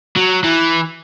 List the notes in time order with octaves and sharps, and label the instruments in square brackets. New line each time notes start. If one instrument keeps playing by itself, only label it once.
[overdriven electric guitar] F#3
E3